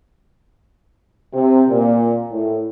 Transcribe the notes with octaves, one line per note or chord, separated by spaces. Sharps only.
C3
A#2
A2